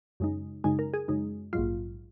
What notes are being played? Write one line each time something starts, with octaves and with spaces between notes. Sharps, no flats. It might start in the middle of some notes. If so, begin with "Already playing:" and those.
F#2 C#3 G#3 D#4
F#2 C#3 G#3 D#4 G#5
A#4
G#4
F#2 C#3 G#3 D#4
A#1 G#2 F#3 F4